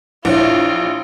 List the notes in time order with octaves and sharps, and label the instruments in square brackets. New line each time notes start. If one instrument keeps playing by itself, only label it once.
[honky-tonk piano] A#1 [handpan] E4 C#5 [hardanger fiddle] F4